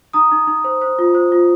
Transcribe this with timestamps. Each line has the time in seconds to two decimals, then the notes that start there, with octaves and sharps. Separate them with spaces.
0.13 D#4 A#5 D#6
0.31 D#4
0.47 D#4
0.64 C5
0.82 C5
0.99 F4
1.15 C5
1.32 F4